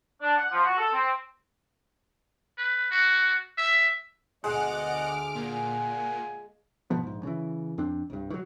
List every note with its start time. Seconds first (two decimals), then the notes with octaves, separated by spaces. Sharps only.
0.21 D4
0.36 F#5
0.51 F3
0.65 F#4
0.77 A4
0.92 C4
2.58 B4
2.91 F#4
3.58 E5
4.44 D2 B2 G#3 D5 D#5 F#5 D6 F6
5.35 A#2 F5 F#5 G#5
6.90 G#1 B2 F3 B3
7.03 A#1 G#2
7.23 C#3 E3
7.78 F2 C4 D4
8.10 C2 G2
8.30 D#3 F#3